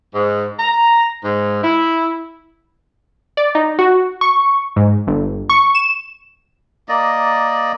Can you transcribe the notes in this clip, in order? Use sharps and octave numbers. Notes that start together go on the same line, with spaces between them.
G#2
A#5
G#2
E4
D5
D#4
F#4
C#6
G#2
G1
C#6
E7
A#3 D5 D#5